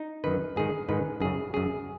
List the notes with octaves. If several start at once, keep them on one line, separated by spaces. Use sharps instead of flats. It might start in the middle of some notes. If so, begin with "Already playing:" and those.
Already playing: D#4
F#2 D#3 B4
G#2 D#3 G#4
G#2 D#3 B4
F#2 C#3 G#4
F#2 C#3 G#4